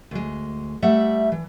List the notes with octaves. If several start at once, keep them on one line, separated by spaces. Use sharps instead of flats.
D2 G#3
G3 A3 E5 F#5
E3